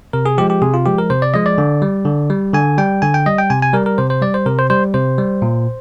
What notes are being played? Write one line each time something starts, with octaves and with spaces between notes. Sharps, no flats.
C3 A#4
G#4
F3 G#3 G4
G4
C3 G#4
F4
F3 G#3 G4
A#4
C3 C5
D5
F3 G#3 D#5
D5
D3
G3
D3
G3
D3 G#5
G3 G5
D3 G#5
G5
G3 D#5
G5
C3 G#5
G#5
G3 A#4
A#4
C3 C5
C5
G3 D5
C5
C3 A#4
C5
G3 C5
C3 C5
G3
A#2